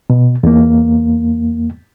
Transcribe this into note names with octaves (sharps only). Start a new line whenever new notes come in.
B2
E2 A#3